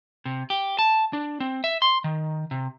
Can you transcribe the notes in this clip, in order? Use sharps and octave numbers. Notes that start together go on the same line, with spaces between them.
C3
G4
A5
D4
C4
E5
C6
D#3
C3